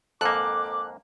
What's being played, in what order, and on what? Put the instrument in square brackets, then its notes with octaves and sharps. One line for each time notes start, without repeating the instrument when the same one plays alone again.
[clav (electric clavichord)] F2 G#2 A#3 [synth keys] A4 F#6 [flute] D6